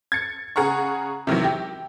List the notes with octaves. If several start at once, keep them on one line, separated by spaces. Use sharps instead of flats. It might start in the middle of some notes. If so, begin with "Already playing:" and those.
G#6 A6 C#7
C#3 G#4 F#5 A#5 C#6
C3 D#3 E3 F#3
G4